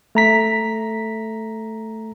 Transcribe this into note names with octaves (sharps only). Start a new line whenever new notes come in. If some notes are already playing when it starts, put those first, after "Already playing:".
A3 A#5 B6